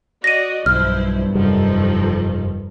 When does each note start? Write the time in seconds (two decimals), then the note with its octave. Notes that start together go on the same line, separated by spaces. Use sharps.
0.24 F#4 D5 D#5 A#6 D#7
0.66 B1 G2 F3 E4 C5 F6
1.35 F1 F#2 D#3 F3 G3 A4